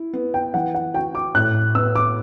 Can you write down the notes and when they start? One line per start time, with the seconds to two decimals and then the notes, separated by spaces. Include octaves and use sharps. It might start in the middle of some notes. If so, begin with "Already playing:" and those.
Already playing: E4
0.13 B3
0.34 G5
0.54 E3 F#5
0.74 F#5
0.94 F#4 G5
1.15 D6
1.35 A2 F#6
1.75 B3 E6
1.96 D6